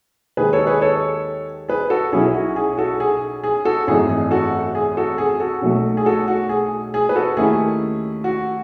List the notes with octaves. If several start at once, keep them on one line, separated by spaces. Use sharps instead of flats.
D#2 D#3 G#3 G#4 B4
A4 C#5
G#4 B4
A4 C#5
G#4 B4
F#4 A4
B1 B2 F#3 C#4 E4 G#4
F#4
G#4
F#4 A4
G#4
G#4
F#4 A4
G#1 F#2 E3 A3 D#4 G#4
G#4
F#4 A4
G#4
F#4 A4
G#4
F#4 A4
B1 B2 F#3 A3
G#4
F#4 A4
F#4
G#4
G#4
B4
F#4 A4
D#2 D#3 A3 C#4 E4 G#4
F#4